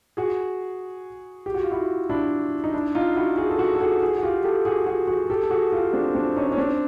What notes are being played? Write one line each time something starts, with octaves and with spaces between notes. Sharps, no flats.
F#4 G#4
G4
F#4
F4
E4 F#4
D4 E4
D#4
D4 E4
D#4 F4
E4 F#4
F#4 G#4
A4
F#4 G#4
A4
F#4 G#4
F#4 G#4
F#4
F4 G4
G4 A4
F#4 G#4
F#4 G#4
F#4 G#4
G4 A4
A4
F#4 G#4
F4 G4
C4 D4
C4 D4
C#4 D#4
C#4
C4 D4